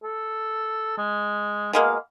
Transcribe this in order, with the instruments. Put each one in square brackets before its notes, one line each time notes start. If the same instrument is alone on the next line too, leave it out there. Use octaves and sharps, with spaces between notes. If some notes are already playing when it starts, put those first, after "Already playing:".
[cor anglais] A4
G#3
[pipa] B2 G#3 A#3 [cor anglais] F5